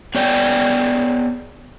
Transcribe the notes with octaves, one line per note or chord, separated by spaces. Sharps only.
B3 G#4 C#5 D5 G5 G#5